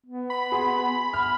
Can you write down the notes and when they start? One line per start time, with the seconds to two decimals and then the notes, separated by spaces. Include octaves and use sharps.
0.06 B3
0.30 B5
0.52 G#4 C6
1.13 F6